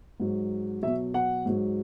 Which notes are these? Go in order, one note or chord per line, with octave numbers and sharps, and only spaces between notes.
G#2 F#3
B2 F#3 E5
F#5
G#2 F#3